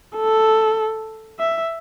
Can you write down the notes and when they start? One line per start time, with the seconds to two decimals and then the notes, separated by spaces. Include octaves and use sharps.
0.16 A4
1.40 E5